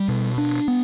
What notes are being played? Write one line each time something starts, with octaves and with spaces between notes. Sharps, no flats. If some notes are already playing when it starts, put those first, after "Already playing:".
Already playing: G3
B2
D4
B3